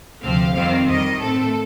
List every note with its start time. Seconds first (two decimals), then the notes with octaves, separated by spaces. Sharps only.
0.22 D2 C3 F3 C4 F5
0.54 F2 D#3 G3 C4 F5
0.87 F2 D#3 G3 D#5
1.20 A2 A3 C4 A4